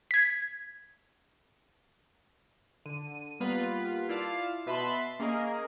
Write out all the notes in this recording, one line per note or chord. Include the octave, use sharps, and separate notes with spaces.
G#6 B6
D3 D#7
G3 A#3 B3 F4 B4
E4 F4 D5 F5 A5
B2 B4 E5 A5 B5 C6
A#3 C#4 G#4 A#4 D#5